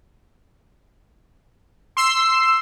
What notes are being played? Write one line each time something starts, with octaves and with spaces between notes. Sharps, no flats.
C6 E6 C7